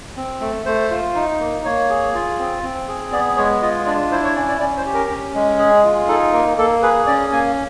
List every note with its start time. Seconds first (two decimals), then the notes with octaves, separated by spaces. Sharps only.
0.17 C4
0.41 A3
0.66 A3 C5
0.91 F4
1.15 D#4
1.40 A#3
1.65 A#3 C#5
1.90 G#4
2.15 F4
2.39 C4
2.63 C4
2.88 G#4
3.12 B3 D5
3.37 G#3 C#5
3.62 F4 D#5
3.86 D4 D5
4.12 E4 C5
4.24 C#5
4.36 C#4 D5
4.48 D5
4.60 C#4 D5
4.77 C5
4.86 G4
4.94 A#4
5.10 C#4
5.34 G#3
5.59 G#4
5.85 F4
6.08 D#4 A4
6.33 A#3 A#4
6.58 A#3 A4
6.83 G#4 B4
7.07 C#4 D5
7.32 A#3 G#5